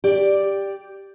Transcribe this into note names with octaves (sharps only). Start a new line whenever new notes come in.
G4 D5